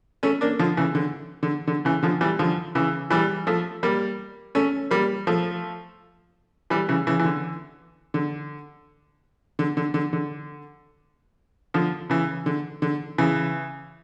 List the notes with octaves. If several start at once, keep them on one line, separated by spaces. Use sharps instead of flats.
A3 C#4
A#3 D4
D3 F3
C#3 E3
D3
D3
D3
C#3 E3
D3 F3
E3 G3
D3 F3
C#3 E3
E3 G3
F3 A3
G3 A#3
A3 C#4
G3 A#3
F3 A3
E3 G3
C#3 E3
C#3 E3
E3
D3
D3
D3
D3
D3
D3
D3 F3
C#3 E3
D3
D3
C#3 E3